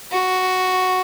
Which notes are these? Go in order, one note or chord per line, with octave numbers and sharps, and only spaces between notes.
F#4